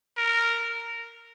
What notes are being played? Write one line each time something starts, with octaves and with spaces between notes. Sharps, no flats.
A#4